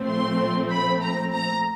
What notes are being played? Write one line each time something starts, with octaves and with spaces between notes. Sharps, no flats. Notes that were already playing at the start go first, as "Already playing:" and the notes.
Already playing: A#2 F3 A3 C4
C6
B5
A#5
A#5